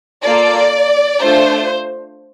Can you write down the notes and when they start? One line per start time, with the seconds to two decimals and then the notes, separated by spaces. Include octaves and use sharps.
0.23 A#3 F4 A4 D5
1.20 A3 D4 F4 A4 C5